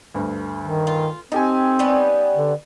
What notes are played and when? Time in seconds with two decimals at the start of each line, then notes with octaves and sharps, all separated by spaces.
0.14 D2 G2
0.61 D#3
0.87 F4
1.32 C4 D#4 G4 A4 G#5
1.79 G3 B3 C#4
2.35 D3